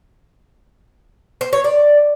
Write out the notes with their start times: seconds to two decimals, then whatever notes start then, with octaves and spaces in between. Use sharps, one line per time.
1.41 C5
1.53 C#5
1.64 D5